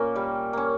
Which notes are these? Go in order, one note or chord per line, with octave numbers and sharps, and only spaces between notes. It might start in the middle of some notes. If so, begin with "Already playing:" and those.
Already playing: A#2 A#3 C#4
G3
A#3 C#4